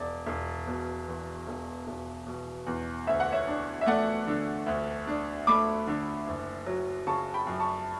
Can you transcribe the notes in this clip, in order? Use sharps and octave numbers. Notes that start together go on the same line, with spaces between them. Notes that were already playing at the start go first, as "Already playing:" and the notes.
Already playing: E1 D5
E1
B2
E2
E1
E1
B2
E2
D2 E5
F#5
C#5 E5
D4
E5
A3 D5 F#5
D3
D2
D4
A3 B5 D6
D3
F#1
F#3
C#3 A5 C#6
G5 B5
F#2
A5 C#6